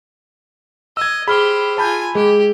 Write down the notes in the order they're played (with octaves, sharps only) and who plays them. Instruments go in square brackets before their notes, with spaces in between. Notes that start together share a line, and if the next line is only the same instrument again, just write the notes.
[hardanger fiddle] D#5 [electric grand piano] E6 G#6
[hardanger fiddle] G4 C5 [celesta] G#4 F6 G7 [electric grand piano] B5
[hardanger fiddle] F4 G#5 [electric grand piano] A5 B5 G6
[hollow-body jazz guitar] G#3 [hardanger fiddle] G4 [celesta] G#4